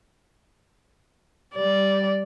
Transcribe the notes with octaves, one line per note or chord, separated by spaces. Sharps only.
G3 D5